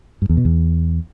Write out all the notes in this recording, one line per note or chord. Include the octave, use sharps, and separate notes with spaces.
G2
E2
B2
E2